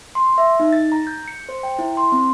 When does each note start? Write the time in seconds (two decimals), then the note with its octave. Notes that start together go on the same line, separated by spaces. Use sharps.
0.15 C6
0.38 E5
0.60 D#4
0.73 A6
0.92 A#5
1.07 G6
1.28 C#7
1.49 C5
1.63 G5
1.79 E4
1.97 C6
2.12 C4